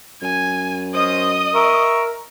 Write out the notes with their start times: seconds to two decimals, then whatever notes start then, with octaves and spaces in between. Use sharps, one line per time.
0.22 F#2 G#5
0.94 C#4 C5 D#5 D#6
1.54 A#4 E5 C#6